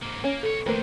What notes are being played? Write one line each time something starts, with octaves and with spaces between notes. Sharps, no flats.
G#2 A#3
A#3 C#4
B1 A4 C#5
F2 D#3 A3 A#3 B4 C5